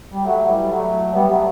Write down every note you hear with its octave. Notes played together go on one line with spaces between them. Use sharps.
G3
F#3 A3
E3 G3
F#3 A3
G3 B3
F#3 A3